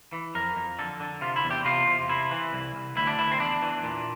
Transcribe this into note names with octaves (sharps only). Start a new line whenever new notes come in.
E3
F2 A#4
F2
D3 A4
D3
C3 F4
E4
E2
G4
C3 F4
C3
C3 E4
E3
C2
C2
D2 E4
D4
D2 E4
C4
E2 D4
E3
A#2